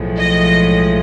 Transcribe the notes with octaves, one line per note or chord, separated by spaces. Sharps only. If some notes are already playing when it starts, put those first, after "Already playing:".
Already playing: B1 A2 F3 G#3
D#5